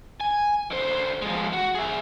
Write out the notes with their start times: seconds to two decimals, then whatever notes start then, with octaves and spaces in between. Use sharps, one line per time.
0.20 G#5
0.71 D3 C5
1.22 F3 G#3
1.53 F#4
1.75 G#4 E5